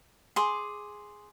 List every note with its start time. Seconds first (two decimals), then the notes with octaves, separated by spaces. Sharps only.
0.36 G#4 C6 D6